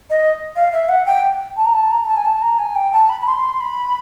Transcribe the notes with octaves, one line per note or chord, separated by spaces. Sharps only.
D#5
F5
E5
F#5
G5
A5
A#5
A5
A#5
A#5
A5
G#5
A5
A#5
G#5
G5
A5
B5
B5
C6
B5